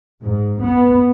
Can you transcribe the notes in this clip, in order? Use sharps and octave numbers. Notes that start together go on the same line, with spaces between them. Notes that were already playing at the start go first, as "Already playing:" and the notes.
G#2
B3